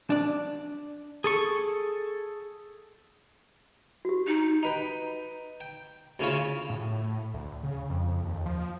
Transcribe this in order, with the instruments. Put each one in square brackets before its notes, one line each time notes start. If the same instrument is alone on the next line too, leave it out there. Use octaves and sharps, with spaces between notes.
[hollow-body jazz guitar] D4 D5
[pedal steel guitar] G#4 A4 C#6
[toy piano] F#4 G4
[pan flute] D#4
[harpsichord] D#4 B4 G5
G5
D2 C#3 C#4 E4 F4 C#5
[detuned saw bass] A2
D2
C#3
F2
D#2
F3